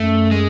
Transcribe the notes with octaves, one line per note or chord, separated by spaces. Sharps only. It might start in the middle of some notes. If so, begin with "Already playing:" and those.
Already playing: F#2 A3
G#3